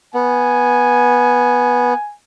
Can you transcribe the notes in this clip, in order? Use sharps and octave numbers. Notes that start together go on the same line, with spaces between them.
B3 G#5